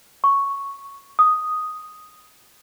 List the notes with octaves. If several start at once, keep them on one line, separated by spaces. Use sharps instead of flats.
C#6
D#6